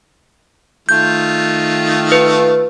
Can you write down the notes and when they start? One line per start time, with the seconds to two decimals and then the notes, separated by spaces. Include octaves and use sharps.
0.89 D#3 A3 F4 G6
2.12 B4